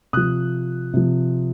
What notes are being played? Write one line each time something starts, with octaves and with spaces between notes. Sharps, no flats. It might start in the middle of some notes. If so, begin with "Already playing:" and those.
C3 F3 D#6 F#6
C3 F3